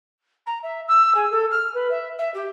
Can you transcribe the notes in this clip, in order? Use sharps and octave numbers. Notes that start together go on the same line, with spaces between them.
A#5
E5
E6
G#4
A4
F6
B4
E5
E5
G4